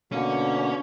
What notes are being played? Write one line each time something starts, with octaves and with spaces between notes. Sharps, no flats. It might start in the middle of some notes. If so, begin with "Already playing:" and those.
B2 D3 A#3 C#4